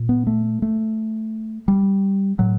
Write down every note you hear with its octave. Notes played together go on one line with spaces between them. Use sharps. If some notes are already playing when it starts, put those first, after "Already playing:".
Already playing: A#2
B3
A3
A3
G3
A2 F#3